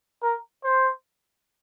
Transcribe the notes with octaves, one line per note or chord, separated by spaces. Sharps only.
A#4
C5